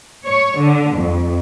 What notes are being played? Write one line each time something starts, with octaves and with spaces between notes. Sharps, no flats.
C#5
D3
F2